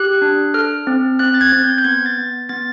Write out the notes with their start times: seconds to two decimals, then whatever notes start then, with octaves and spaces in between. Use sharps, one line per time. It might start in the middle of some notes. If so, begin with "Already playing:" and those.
Already playing: G4 F#6
0.22 D4
0.54 A4 F6
0.87 C4
1.19 C4 F#6
1.34 A6
1.41 G#6
1.53 C4
1.63 G6
1.78 G6
1.85 B3 G#6
2.06 A6
2.18 B3
2.49 B3 A6